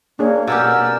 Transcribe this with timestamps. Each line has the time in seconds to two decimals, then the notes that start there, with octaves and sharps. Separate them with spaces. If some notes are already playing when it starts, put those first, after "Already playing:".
0.19 A#3 D4 G#4 C#5
0.47 B2 C#4 G4 A#4 D5 F#5 E6